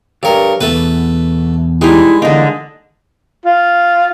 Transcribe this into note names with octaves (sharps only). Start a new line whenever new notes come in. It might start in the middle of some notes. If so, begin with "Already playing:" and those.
G2 G4 A4 A#4 C#5
E2 G2 B2 A3 B4
G3 G#3 D#4 E4
D3 E3 A#3 D#4 D#5
F4